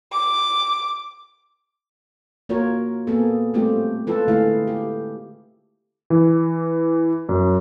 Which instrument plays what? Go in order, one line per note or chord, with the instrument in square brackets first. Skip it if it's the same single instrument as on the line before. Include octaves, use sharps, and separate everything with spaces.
[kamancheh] D6
[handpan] A#3 F4 F#4 A#4 C#5
A#3 B3 G#4 A4
G3 A3 C4 F4 G4
G#3 F4 A4 B4
D3 A3 E4 G#4 F5
G4
[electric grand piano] E3
F#2